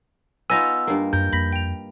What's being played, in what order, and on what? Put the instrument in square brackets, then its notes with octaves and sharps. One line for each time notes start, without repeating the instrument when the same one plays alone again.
[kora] B3 D#4 F4 [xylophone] G#5 A#6 [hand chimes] E6
[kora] G2 A#3
[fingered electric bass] F#2 [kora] A#4 [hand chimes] G6
[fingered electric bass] F2 A#3 [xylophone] B5 A#6 B6
[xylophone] G5 F7